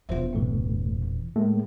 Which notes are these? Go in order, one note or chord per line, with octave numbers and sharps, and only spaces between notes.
E1 E2 F4 C5 E5
C2 G2 A#2 E3 A3
A2 G#3 A#3